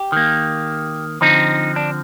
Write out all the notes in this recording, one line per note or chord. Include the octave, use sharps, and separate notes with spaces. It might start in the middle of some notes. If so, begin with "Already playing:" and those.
Already playing: G4
D#3 A#3
D3 F3 C4 D#4
D4